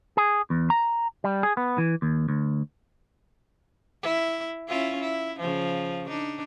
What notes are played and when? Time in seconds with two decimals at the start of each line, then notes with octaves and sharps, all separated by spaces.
0.17 G#4
0.50 E2
0.70 A#5
1.24 G3
1.43 G#4
1.57 B3
1.78 E3
2.02 D#2
2.29 D2
4.03 E4
4.68 C#4 E4 F4
5.00 E4
5.39 C#3 F3
6.07 D4 D#4